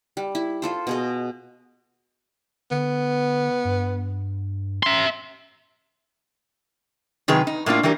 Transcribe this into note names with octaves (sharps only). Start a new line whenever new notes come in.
G3
E4
F4 A4 C5
B2 G#4 D#5
D3 B3
G2
E5 C6
C3 D#3 F#3 G#4 B4
D#4
A2 A#3 D4 F4
E3 G3 G4 A#4